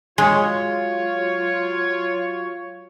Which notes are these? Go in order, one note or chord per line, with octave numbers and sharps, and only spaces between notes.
F#3 G#3 F4 C#5